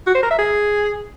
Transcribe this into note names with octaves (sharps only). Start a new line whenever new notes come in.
F#4
C5
A#4
E5
G#4